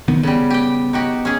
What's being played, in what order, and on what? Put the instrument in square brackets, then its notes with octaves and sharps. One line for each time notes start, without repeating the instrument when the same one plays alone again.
[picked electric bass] C2 D#3 B3
[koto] C#3 G3 [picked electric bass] B3
[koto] G4 G5
D#4 F#4 G4
C#4 G#4